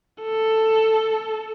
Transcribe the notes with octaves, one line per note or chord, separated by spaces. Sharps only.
A4